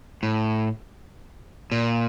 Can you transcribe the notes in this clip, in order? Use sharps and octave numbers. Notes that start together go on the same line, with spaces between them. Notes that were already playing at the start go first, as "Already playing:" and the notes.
A2
A#2